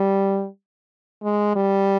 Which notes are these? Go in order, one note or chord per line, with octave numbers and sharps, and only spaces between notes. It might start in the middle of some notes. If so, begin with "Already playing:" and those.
Already playing: G3
G#3
G3